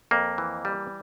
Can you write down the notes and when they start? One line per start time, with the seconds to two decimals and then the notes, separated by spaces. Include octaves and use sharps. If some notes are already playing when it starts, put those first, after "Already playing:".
0.11 F2 A#3
0.38 E3
0.65 G3